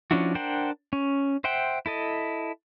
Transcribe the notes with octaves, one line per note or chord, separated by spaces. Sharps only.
F3 C#4 D4 E4 F#4
D4 A#4 C5 F#5 G5
C#4
C5 E5 F#5 G5 C6
E4 A4 D#5